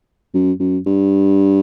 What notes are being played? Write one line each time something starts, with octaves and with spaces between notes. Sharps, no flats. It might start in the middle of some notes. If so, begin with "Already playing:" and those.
F#2
F#2
G2